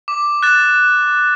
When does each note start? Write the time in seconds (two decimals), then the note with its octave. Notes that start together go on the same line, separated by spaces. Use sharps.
0.08 D6
0.43 F#6 A6 E7